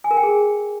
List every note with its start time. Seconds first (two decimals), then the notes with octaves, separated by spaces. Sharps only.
0.04 G#5
0.11 A#4
0.17 G5
0.23 G#4